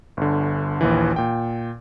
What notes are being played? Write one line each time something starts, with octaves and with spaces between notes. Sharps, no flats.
G1 D3
A#1 D#2 E3
A#2 G5